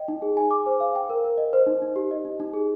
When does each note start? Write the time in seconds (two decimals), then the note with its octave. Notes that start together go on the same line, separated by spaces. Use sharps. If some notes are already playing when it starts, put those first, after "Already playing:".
Already playing: D#5 G5
0.08 D#4
0.22 G#4
0.37 G#5
0.51 D6
0.66 C5
0.80 F5
0.95 G5
1.09 A#4
1.24 A#4
1.38 D#5
1.53 C5
1.67 D#4
1.82 D#4
1.96 G4
2.11 D#5
2.25 D#4
2.40 D#4
2.54 G#4